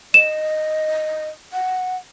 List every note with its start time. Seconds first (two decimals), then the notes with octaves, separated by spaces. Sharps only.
0.14 D#5 E7
1.53 F#5